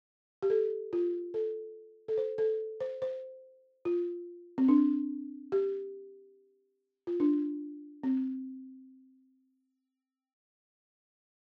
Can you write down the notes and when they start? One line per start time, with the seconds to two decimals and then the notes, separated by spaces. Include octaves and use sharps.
0.43 G4
0.50 A4
0.93 F4
1.34 A4
2.08 A4
2.18 C5
2.38 A4
2.80 C5
3.02 C5
3.85 F4
4.58 C4
4.68 D4
5.52 G4
7.07 F4
7.20 D4
8.03 C4